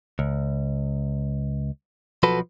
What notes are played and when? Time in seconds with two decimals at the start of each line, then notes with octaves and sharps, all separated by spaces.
0.19 C#2
2.23 B1 F3 F#4 A4 B4 B5